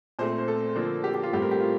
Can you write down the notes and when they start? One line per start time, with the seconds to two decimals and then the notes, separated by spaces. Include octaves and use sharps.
0.19 A#2 A3 C4 C5
0.38 C5
0.48 A4
0.76 D3 F3 A#3
1.04 G4
1.14 G4
1.23 F4
1.33 A2 G3 C4 G4
1.42 A#4
1.51 G4
1.60 F4